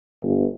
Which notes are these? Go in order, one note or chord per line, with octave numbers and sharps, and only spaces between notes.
G1